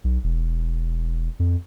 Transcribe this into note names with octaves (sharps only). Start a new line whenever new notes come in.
B1
E1
F2